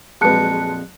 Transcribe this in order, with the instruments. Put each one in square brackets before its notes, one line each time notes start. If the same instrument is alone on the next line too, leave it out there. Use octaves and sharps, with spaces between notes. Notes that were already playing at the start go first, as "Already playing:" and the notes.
[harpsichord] A#1 F2 [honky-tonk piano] F#3 G#3 B4 [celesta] A5 F#6 C#7